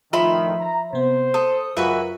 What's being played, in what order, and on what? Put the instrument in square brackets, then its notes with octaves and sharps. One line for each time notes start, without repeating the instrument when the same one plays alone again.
[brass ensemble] F2 A2 D#3 [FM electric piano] F3 [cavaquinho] E5 B5 C6
[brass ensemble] A#5
[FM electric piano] C3 B3 [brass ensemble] C5
[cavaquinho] A4 [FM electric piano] D#6
[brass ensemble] C#2 E3 [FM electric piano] F#2 F4 A#4 [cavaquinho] F#4 B4 E5